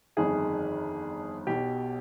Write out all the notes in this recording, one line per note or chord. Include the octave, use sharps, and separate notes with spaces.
G1 F2 D#3 G#4
B1 B2 G4